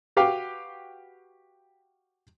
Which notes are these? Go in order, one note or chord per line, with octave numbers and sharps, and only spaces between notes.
F#4 G4 B4 F5 G5